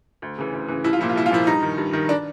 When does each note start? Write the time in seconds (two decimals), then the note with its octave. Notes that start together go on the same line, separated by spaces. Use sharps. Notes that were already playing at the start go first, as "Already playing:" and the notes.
0.22 D2
0.38 C#3 E3
0.53 D2
0.68 C#3 E3
0.84 C2 E4
0.93 F4
0.99 A#2 F3 E4
1.09 F4
1.16 C2 E4
1.26 F4
1.31 A#2 F3 E4
1.47 G2 D#4
1.62 D#3
1.78 G2
1.93 D#3
2.09 D4